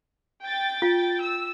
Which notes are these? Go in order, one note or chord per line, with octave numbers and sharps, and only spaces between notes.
G5 A6
F4
E6